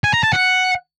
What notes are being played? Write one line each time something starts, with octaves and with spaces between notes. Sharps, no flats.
G#5
A#5
A5
F#5